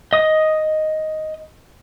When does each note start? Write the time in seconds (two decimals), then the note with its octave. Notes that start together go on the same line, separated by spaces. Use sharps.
0.13 D#5 D#6